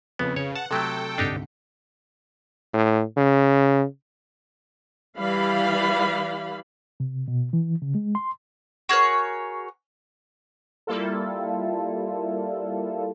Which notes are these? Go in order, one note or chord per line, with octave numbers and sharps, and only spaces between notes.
F2 C#3 B3 B4
C#3 C#5
F#5 A5
C3 F#3 A3 A4 G5
D2 G#2 C3 D4 D#4 G4
A2
C#3
E3 G3 F5 B5
C3
B2
E3
C#3
G#3
C6
F#4 G#4 A#4 C#5
G3 A#3 E4 F4 A4